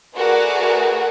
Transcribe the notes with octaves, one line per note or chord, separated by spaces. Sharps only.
A3 F#4 G#4 A#4 B4 D5